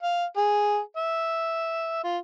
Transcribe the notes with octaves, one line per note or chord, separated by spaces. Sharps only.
F5
G#4
E5
F4